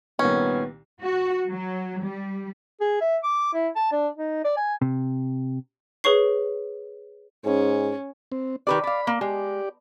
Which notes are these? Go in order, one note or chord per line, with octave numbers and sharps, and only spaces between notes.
C2 A#2 D#3 B3 C#4
F#4
F#3
G3
G#4
E5
D6
E4
A5
D4
D#4
D5
G#5
C3
G#4 B4 C#5 C#6 C7
G#2 C#4
C4
D#3 G4 B4 D5
D5 F5 B5
A#3
G#3 G4 D5